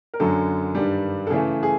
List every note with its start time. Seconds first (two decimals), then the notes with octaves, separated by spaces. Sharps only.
0.14 A#4
0.20 F#2 D3 F#3 A4
0.75 G2 D#3 G3
1.27 A4
1.30 C#3 E3 A3 G#4
1.63 G#4